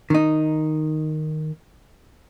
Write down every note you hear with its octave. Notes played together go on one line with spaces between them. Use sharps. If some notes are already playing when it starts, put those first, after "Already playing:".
D#3 D#4